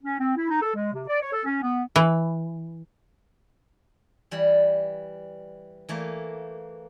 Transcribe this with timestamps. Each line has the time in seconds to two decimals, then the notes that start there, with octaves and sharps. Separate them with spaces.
0.03 C#4
0.19 C4
0.36 E4
0.50 D#4
0.62 A4
0.75 G#3
0.93 C3
1.07 D5
1.22 C#5
1.33 A4
1.45 C#4
1.62 B3
1.96 E3
4.31 E3 G3
5.89 E3 A3 A#3